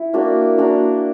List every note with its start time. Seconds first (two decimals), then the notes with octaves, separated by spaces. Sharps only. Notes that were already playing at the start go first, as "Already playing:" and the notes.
Already playing: E4
0.14 A#3 D4 F#4 A#4
0.58 A#3 D4 F#4 A#4